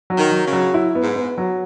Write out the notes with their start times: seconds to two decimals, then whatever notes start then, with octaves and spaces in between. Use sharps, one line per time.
0.10 F#3
0.17 D#3
0.32 F#3
0.46 C#3
0.52 F#3
0.74 E4
0.95 B3
1.02 G#2
1.16 B3
1.38 F#3